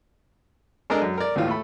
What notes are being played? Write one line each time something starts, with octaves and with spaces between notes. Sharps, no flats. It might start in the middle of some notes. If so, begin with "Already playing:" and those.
G#3 D4 A4 A#4 D5 D#5
F#2
A#4 D5
D#2 A2 E3 F4
A3 B5